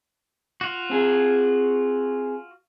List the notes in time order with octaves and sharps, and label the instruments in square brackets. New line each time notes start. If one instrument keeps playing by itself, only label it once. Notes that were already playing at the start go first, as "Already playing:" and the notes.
[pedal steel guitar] F4 F#4
[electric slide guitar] C4 G#4